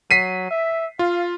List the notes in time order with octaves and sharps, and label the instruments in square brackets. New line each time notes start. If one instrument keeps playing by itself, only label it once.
[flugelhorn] F#3 [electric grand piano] B6 C7 D#7
[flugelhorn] E5
[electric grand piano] F4 [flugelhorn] F5